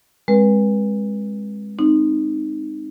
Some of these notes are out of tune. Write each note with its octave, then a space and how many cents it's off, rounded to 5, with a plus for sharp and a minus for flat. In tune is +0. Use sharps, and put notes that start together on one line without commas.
G#3 -15 C4 +30 B4 -25
C4 +0 D#4 -10